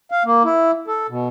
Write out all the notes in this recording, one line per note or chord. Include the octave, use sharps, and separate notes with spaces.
F5
A#3
E4
A4
B2